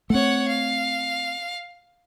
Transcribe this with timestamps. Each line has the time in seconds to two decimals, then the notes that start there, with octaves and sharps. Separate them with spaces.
0.10 A3 C4 C#5 F#5
0.48 F5